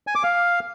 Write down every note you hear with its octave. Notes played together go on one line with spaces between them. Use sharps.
G#5
D6
F5